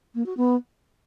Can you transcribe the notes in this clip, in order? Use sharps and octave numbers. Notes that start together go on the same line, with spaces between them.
A#3
F#4
B3